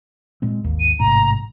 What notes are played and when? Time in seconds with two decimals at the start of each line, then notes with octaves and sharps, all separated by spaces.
0.42 A#2 G#3 C4
0.64 G#1 D#2
0.80 D#7
0.99 A1 G#2 C3 A#5